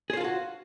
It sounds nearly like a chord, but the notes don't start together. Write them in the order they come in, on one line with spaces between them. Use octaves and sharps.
G#4 C5 F4 A4 F#4